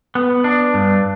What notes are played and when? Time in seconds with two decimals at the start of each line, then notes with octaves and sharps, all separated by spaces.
0.15 B3
0.44 D4
0.74 G2